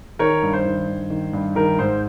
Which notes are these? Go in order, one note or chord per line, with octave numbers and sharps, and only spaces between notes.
D#3 A#4 C#5
G2
C5
D#3
G2
D#3
G2
D#3 A#4
G#2 C5